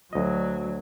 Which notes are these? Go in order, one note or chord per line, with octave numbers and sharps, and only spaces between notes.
D2 F#3 D#5